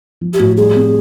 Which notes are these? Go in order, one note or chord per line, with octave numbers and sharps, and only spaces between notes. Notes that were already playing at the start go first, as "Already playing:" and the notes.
F3
G4
A2 F#4
G3 G#4
C4